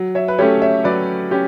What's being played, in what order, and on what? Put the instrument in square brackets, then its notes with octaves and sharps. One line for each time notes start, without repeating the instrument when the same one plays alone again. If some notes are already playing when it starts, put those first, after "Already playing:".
Already playing: [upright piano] F#3
[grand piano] C#5 E5
B4
[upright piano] A3 C#4 G4 [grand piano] A4 C#5
[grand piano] C#5 E5
[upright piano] F#3 [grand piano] B4 D5
[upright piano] C#4 G4